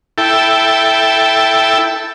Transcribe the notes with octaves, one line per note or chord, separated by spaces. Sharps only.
E4 A4 G5